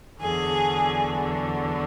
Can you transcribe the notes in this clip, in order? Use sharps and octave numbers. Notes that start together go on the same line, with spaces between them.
E2 D3 F#3 G#4